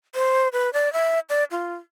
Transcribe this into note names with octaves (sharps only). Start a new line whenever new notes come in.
C5
B4
D5
E5
D5
F4